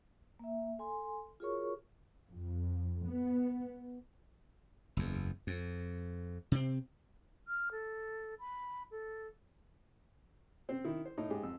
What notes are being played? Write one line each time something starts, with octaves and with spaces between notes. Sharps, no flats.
A#3 E5
A4 G#5 C6
F4 F#4 G#4 A#4 C#5 C#6
F2
B3
F#1 E2
F2
C3 C4
F6
A4
B5
A4
C4 C5
D#3 E4
C5
A2 D#4
G#2 G4 G#4
F2 E6